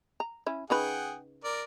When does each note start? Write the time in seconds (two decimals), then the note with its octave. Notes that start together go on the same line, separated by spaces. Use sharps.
0.20 A#5
0.46 C#4 E4
0.70 C#3 D#4 G#4 B4 F#5 G5
1.44 A#4 D5